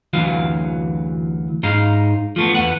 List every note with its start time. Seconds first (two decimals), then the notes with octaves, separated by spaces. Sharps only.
0.13 D2 E3 F#3 F5
1.63 G#2 D#4 F5
2.36 F3 A3 B3
2.55 E2 B4 F#5